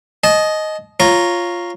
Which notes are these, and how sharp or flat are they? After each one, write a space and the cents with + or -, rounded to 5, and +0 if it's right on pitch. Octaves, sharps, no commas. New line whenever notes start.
D#5 +0 A5 -40
F4 +0 C#5 -5 A#5 +0